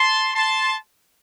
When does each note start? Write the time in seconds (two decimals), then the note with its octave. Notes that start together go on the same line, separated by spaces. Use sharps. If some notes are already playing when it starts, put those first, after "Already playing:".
Already playing: A5 C6
0.34 A5 C6